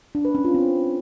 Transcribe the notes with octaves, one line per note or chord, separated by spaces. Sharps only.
D4
B4
C#4
F4
C4